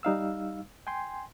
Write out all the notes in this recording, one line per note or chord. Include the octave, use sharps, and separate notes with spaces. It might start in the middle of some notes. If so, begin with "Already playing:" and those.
G3 D#4 F5 E6
G5 G#5 C6